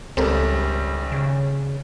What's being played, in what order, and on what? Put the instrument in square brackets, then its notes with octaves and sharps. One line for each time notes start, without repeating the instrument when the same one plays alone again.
[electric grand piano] G#1 G3 [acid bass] C#2 [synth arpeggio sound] C4 A4 A#4
[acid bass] C#3